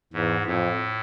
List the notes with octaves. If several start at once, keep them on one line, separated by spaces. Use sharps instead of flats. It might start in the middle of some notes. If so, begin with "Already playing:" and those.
E2 G#2
F2 A2